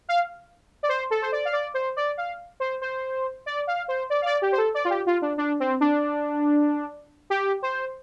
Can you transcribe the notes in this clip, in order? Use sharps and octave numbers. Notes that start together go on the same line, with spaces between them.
F5
D5
C5
A4
C5
D5
F5
D5
C5
D5
F5
C5
C5
D5
F5
C5
D5
F5
D5
G4
C5
A4
D5
F4
G4
F4
D4
D4
C4
D4
G4
C5